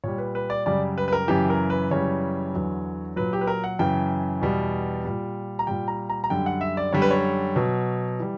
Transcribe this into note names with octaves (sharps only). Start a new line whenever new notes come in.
A#2 G3 C#5
B4
B4
D5
F#2 C#3 G3 D5
B4
B4
A#4
F#2 C#3 E3 G4
A#4
B4
F#2 C#3 E3 G3 C#5
E2 D3 F#3
A#2 F#3 B4
G4
B4
A#4
F#5
F#2 C#3 E3 G5
E2 B2 G3
A#2 G3
A#5
A#2 G3 G5
A#5
A#5
A#5
F#2 D3 G3 G5
F#5
E5
D5
F#2 D3 G3 C#5
B4
C#5
B2 F#3
E3 G3